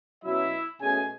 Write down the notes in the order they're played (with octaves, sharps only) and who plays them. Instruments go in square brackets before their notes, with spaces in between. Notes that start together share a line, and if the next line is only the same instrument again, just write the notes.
[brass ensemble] B2 F#3 C#4 E4 E5
B2 A3 C#4 G#4 G#5